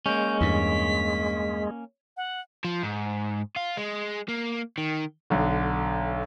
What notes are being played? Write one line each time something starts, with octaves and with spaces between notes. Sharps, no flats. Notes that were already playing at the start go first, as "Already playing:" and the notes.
G#3 A#3 C#4 G6
E2 G2 B6
F#5
F3
G#2
F4
G#3
A#3
D#3
B1 D3